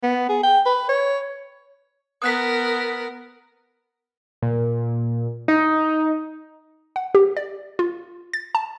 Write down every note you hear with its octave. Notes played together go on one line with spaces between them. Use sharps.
B3
G#4
G5
B4
C#5
B3 A#4 D#6 F#6 B6
A#2
D#4
F#5
G4
D5
F4
A6
A5